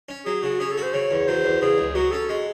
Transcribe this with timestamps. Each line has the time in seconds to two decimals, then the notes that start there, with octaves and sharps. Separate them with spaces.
0.09 C#4
0.26 F#3 G#4
0.43 C#3 F#4
0.59 C#4 G#4
0.72 A4
0.77 F#4
0.83 C5
0.93 C#3 C#5
1.11 E2
1.28 F#3 C5
1.45 E2
1.61 C#3 G#4
1.78 C#2
1.95 F#3 F#4
2.12 C#4 A4
2.29 G#3 F#4